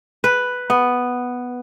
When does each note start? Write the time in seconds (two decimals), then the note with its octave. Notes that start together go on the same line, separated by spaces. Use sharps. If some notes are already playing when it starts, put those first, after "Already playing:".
0.24 B4
0.70 B3